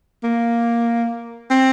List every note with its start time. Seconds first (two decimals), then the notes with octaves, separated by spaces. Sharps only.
0.24 A#3
1.50 C4